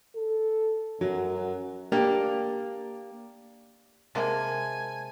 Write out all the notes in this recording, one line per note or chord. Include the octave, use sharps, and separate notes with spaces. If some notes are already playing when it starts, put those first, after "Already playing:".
A4
F#2 F#3
A#3 D4 G4
C3 G#3 A#3 G#5 A5